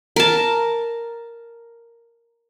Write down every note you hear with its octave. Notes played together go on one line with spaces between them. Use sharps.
A#4 A5